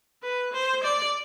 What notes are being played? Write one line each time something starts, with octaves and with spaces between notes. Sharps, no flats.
B4
C5
D5